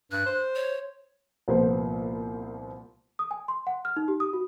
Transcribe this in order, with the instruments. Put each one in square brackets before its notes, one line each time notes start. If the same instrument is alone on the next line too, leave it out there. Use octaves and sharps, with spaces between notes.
[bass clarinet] G2 [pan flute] F#6
[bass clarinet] C5
[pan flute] C#5
[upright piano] C2 A#2 F3 B3 C5
[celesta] D#6
G#5
C6
F#5
F6
D#4
G4
D#6
F#4